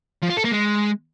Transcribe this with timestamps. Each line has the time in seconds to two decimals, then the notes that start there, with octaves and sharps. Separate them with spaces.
0.22 F3
0.30 F4
0.37 A4
0.44 A#3
0.52 G#3